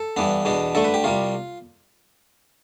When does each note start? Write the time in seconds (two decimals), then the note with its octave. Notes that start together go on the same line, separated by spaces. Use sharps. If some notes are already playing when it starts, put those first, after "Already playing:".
Already playing: A4
0.17 G2 E3 B3 D4
0.45 E2 B2 B3 D4
0.75 D2 D3 A3 A4
0.84 B4
0.94 G4
1.04 C2 C3 G3 F4